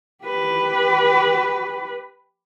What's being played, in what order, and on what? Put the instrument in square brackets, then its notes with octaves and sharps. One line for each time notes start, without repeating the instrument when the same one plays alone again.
[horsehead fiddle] G4 B4